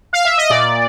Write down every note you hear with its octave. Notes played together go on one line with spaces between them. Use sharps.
F5
E5
D#5
A#2 D5